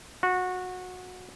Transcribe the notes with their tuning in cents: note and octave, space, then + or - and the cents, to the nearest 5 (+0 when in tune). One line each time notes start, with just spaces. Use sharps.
F#4 -20